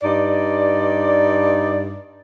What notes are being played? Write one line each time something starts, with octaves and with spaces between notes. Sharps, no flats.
G2 D#4 D5